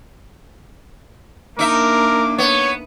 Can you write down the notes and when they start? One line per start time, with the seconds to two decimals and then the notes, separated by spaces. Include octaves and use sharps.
1.59 A#3 D4 D#4 A#4 E5 D6
2.39 B3 C#5